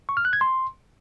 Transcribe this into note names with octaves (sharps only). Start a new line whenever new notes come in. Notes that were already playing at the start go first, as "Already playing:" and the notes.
C#6
F6
F#6
G#6
C6